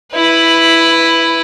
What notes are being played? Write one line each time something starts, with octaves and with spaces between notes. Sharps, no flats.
E4 B4